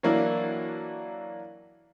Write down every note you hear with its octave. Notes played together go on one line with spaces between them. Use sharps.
E3 F#3 A#3 D4 E4